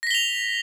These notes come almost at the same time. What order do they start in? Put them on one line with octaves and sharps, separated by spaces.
A#6 B6 G7 F7